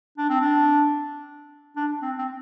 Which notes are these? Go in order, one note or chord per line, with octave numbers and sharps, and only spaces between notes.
D4
C4
D4
D4
C4
C4